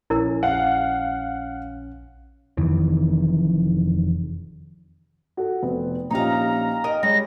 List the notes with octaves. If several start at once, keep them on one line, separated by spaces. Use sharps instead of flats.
A#1 C#4 E4 A#4
F5 F#5
F1 F2 D#3 E3
F#4 A4
F1 B3 C4
A#1 C#4 D#4 G4 F5 A#5
A#4 D#5 G5 D#6
G3 G#3 C#5 A#6